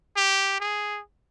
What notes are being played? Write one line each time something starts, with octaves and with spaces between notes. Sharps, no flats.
G4
G#4